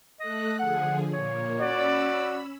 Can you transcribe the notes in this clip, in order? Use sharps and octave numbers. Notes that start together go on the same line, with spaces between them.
A3 A4 D#5 F#6
D3 F3 G#4 F#5
A#2 A#3 C#5
C#4 F#4 D5 B5 E6